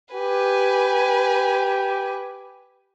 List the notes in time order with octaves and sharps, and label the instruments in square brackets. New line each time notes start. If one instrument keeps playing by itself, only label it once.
[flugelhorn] G4 [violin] B4 G#5